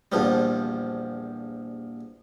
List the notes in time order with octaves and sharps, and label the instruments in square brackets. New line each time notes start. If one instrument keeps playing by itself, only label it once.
[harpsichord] A#1 E2 F3 G3